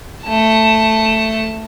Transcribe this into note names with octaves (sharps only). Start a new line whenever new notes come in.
A3 A5